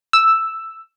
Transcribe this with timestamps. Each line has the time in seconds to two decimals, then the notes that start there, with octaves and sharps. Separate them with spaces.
0.13 E6